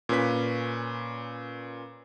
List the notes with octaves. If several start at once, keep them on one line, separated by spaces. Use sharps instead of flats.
A#2 C#4 B4 B6